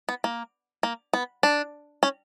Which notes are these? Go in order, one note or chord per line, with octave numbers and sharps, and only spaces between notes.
B3
A#3
A#3
B3
D4
C#4